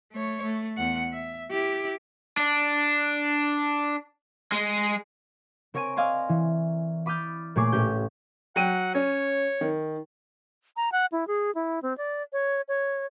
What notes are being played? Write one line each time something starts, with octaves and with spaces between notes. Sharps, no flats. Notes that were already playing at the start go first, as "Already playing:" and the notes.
A3 C#5
A3
E2 F#5
E5
E4 G4
D4
G#3
C4 A#4 C#5 G#5 D7 D#7
D5 D#5 F5 G#5 A#5 C6
E3
B5 D6 D#6 F6 G6 A6
A#2 A3 G#4 C#5 D6 C7
A1 C#4 G4 G6
F#3 F#5 G5 D#7
C#4 C#5
D#3
A#5
F#5
E4
G#4
E4
C4
D5
C#5
C#5